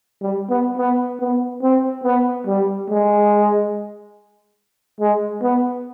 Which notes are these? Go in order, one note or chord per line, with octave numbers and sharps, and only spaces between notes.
G3
B3
B3
B3
C4
B3
G3
G#3
G#3
B3